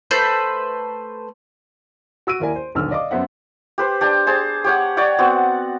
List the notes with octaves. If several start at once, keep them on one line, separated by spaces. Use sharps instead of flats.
A3 B4 C5 G6
F#4 E6 D7 D#7
D#2 E4 A#4 D5 G#5
C5
D#1 B1 D3 D#4 E6 F6
D5 D#5 F5 D6
F#2 B3 C5 E5 F#5
G4 B4 C5
D4 G4 G5
G#4 C5 A5
G4 C#5 F#5
C#5 D5 F#5 G5
B3 C4 F#4